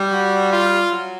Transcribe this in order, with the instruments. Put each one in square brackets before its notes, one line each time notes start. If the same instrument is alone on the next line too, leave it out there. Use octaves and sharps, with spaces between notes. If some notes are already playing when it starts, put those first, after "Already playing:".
Already playing: [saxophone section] G3
[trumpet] F#4
F4
[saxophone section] F#3